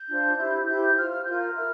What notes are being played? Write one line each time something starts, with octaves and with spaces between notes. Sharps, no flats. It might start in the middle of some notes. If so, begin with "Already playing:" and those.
Already playing: G6
D4 F4 C5
E4 G4 C5
E4 G4 C5 G6
F4 C5 F6
F6
F4 A#4 G6
F6
E4 A#4